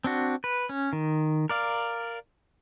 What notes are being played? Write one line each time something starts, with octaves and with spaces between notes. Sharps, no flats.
C4 D4 F#4
B4
C#4
D#3
A#4 D5 F5